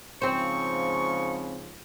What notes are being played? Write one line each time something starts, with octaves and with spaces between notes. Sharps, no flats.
G#2 C#3 F3 C4 C5 C#6